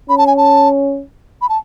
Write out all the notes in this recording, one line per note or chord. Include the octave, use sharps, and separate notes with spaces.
C#4 B5
A5
G#5
A5
B5
A5